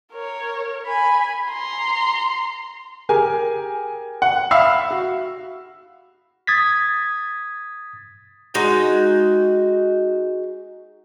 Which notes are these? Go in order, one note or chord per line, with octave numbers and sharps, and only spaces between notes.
A#4 C#5
G#5 B5
A#5 C6
G4 G#4 A#4 G#5
F#5
E5 F5 B5 E6 C7
F#4
D#6 G#6 A6 B6
G#3 D#4 F#4 G5